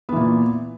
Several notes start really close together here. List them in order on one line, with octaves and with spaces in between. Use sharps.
B3 E3 A#2